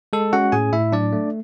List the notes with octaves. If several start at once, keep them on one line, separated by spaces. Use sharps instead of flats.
G#3 A4
C#4 F#4 F#5
A2 G#4 G#5
A2 E4 E5
F#3 D4 D5
A3